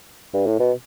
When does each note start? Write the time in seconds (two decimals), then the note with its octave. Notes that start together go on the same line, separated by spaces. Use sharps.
0.34 G2
0.47 A2
0.60 B2